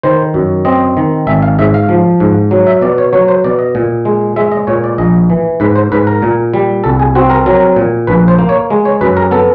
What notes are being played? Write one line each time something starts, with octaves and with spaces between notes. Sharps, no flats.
D#3 C5
F#2
C4 D#5
D#3
G#1 E5
F5
G#2 E5
F5
F3
G#2
F#3
E5
B2 D5
C#5
F#3 C#5
C5
B2 D5
D#5
A#2
G#3
G#3 E5
D#5
A#2 C#5
D5
A#1 D#5
E3
G#2 B4
C5
G#2 B4
A#4
A#2
G3
C2 A4
G#4
C4 F#4
A#4
F#3 A#4
A#2
A#1 B4
C5
A#3
C#5
G#3
C#5
F#2 B4
A#4
B3 A4